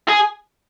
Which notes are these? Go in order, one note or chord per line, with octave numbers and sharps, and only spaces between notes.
G#4